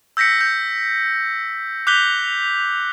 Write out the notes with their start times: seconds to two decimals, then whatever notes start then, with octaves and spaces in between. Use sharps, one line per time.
0.17 E6 G6 A#6 B6 C#7
0.41 G6
1.87 D6 F#6 G6 B6 F7 G7